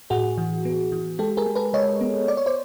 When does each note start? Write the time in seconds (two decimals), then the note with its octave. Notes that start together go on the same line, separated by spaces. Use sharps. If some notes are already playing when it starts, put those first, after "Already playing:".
0.10 A2 F#4 G#4
0.38 E3
0.65 B3
0.92 E3
1.19 G#3 G4 A4
1.37 G#4 A#4
1.47 G#3
1.55 A4 B4
1.73 G#3 C#5 D#5
2.01 B3
2.28 B3 D5
2.37 C#5
2.46 C5 D5